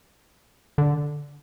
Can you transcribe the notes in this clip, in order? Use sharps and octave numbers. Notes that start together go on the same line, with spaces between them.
D3